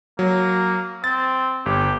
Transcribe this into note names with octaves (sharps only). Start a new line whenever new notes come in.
F#3 A#3
C4 A6
G1 G4